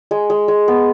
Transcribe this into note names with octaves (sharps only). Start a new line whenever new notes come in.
G#3
G#3
G#3
B3